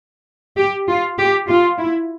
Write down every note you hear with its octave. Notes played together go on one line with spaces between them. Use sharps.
G4
F4
G4
F4
E4